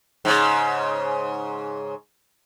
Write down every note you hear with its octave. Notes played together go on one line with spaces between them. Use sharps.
G#2 C#3